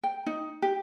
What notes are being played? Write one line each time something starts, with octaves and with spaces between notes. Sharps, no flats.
G5
D#4
G4